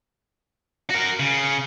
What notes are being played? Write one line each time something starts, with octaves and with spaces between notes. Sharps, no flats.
F#4 A#4
C#3